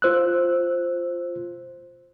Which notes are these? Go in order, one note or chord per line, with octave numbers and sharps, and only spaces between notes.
F4 C5 E6 F#6